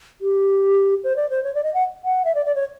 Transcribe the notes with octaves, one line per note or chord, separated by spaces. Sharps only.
G4
C5
D5
C5
C#5
D5
D#5
F#5
F#5
E5
D5
D5
C#5